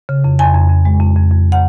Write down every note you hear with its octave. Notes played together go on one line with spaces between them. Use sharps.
C#3
F2
F2 G#5
F2
F2
G#3
F2
F2
F2
F#5